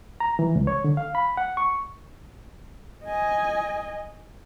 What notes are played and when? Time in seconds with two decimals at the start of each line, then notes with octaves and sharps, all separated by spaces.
0.20 A#5
0.39 E3
0.56 C#2
0.67 C#5
0.84 D3
0.97 F5
1.15 B5
1.37 F#5
1.57 C#6
3.05 D#5 G#5